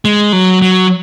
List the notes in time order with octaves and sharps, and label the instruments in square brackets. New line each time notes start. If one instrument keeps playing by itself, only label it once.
[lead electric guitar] G#3
F#3
F#3